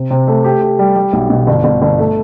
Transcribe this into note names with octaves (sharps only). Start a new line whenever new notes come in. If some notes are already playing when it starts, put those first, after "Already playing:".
Already playing: C3
C3
A3
G4
G4
G3
G3
B1
B2
G1
G1
G1
A3